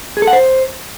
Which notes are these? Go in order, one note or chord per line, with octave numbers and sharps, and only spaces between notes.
G#4
A4
F#5
C5